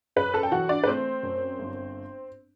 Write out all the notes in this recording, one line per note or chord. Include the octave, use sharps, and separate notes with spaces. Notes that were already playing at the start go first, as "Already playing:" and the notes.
F#2 B4 B5
A4 A5
G5
E3 F#4 F#5
D4 D5
B4
A3 C4 C5
F#2
G1